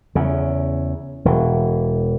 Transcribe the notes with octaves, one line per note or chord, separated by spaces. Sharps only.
E2 C#3
E1 E3